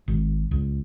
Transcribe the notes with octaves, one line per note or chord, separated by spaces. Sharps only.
G#1
C#2